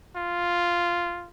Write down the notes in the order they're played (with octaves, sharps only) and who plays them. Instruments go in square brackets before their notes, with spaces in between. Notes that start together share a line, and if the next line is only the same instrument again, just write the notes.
[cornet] F4